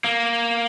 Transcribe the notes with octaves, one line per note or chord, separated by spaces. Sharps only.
A#3